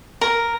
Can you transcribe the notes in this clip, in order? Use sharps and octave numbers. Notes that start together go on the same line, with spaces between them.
A#4